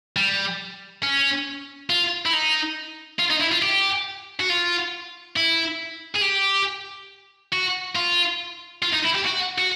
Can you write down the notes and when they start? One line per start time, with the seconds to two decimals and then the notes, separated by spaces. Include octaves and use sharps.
0.16 G3
1.03 C#4
1.90 F4
2.26 E4
2.33 D#4
3.19 F4
3.30 D#4
3.41 E4
3.52 F4
3.62 G4
4.40 F#4
4.50 F4
5.36 E4
6.16 G#4
6.22 G4
7.53 F#4
7.96 F4
8.82 F4
8.93 D#4
9.05 E4
9.14 G4
9.25 F#4
9.58 F#4